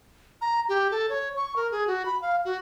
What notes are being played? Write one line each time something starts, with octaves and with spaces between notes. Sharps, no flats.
A#5
G4
A4
C#5
C#6
A#4
G#4
F#4
B5
F5
F#4